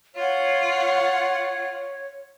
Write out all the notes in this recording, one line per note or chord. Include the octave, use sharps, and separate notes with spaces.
F4 C#5 F#5